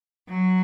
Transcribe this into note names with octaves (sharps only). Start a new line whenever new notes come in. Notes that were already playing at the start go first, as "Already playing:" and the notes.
F#3